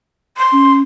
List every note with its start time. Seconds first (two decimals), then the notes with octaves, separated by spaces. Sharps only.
0.37 C6
0.52 C#4